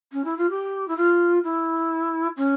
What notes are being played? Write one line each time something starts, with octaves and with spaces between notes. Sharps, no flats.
C#4
E4
F4
G4
E4
F4
E4
C#4